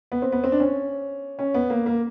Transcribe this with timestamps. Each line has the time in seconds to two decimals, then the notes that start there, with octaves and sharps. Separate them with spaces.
0.12 B3
0.22 C4
0.32 B3
0.44 C4
0.52 D4
0.60 C#4
1.39 C#4
1.54 B3
1.70 A#3
1.86 A#3